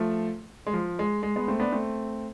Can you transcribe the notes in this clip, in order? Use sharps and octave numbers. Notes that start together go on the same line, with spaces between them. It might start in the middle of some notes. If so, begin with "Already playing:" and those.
Already playing: F3 A3
G#3
F3
G#3
G#3
G#3 B3
A3 C4
B3 D4
A3 C4